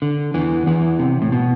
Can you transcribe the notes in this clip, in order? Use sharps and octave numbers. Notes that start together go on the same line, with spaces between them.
D3
E2 E3
E2 E3
C3
A2
B2